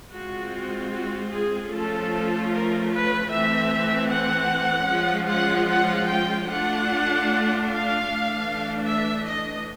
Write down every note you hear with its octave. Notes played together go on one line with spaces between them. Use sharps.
G#3 C4 F4 F#4
F#4
G#4
F3 A3 C#4 F4 A4
A#4
B4
E3 A3 C4 E5
F#5
F3 G#3 C#4 F4
F#5
F#5
G5
A3 D4 F4 F#5
F5
E3 A3 D4
E5
D#5